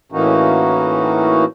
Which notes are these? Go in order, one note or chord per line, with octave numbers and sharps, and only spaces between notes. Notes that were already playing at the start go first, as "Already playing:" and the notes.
A2 E3 A#3 C#4 D#4 F#4